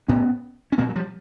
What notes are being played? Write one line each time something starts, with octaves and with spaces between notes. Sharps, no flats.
A2 B3 C#4
C#4
A#2 A#3 C4
F#3
F3 G3